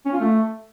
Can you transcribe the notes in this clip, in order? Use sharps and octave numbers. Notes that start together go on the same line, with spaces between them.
C#4
F4
A3